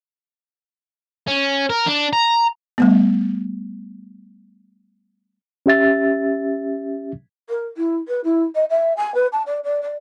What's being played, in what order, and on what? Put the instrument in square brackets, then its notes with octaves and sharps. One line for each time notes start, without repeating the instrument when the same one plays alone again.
[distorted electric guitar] C#4
A#4
D4
A#5
[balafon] G3 A3 B3
[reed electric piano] C#4 G4 E5 A6
[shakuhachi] A#4
E4
B4
E4
D#5
E5
G#5
B4
A5
D5
D5
D5